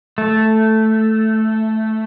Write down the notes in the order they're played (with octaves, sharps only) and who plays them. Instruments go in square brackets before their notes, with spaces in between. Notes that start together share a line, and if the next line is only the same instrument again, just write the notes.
[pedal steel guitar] A3